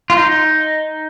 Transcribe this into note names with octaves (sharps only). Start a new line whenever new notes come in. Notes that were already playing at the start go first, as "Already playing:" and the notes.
F4
D#4